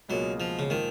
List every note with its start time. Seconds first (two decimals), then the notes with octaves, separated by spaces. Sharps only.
0.09 C#2 B2 F#3 A#3 F4 G#4
0.40 F3
0.59 C#3
0.70 A#2 D#3 F3 G#3